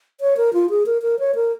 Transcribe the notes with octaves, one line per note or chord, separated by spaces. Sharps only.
C#5
A#4
F4
G#4
A#4
A#4
C#5
A#4